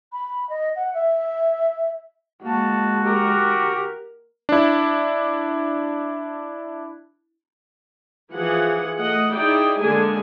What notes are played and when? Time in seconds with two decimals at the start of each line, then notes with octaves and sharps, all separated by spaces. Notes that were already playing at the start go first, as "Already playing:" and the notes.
0.12 B5
0.50 D#5
0.76 F#5
0.94 E5
2.42 G#3 A#3 F#4 A5
3.05 G4 A#4
4.49 D4 E4
8.33 E3 F3 G#4 F#5
8.98 A3 D#5 F#5
9.33 D#4 E4 G#4 D5 G5
9.81 D3 G#3 A#3 D4 G#5